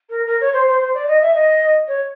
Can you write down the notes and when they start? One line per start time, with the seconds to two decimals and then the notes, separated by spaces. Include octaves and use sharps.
0.10 A#4
0.27 A#4
0.41 C#5
0.53 C5
0.67 C5
0.81 C5
0.94 D5
1.08 D#5
1.21 E5
1.35 D#5
1.88 C#5